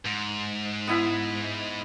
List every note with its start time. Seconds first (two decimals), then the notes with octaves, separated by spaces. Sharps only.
0.06 G#2
0.87 B3 E4 B5